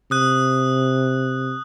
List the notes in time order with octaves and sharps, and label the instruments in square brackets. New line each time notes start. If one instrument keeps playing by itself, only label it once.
[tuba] C3 [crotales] D#6 F#6